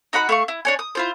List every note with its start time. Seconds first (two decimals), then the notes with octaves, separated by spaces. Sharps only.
0.13 D#4 F#4 F#5 B5
0.29 A3 F5 C#6
0.48 E4
0.65 D4 C#5 G#5
0.79 D#6
0.95 E4 F4 C5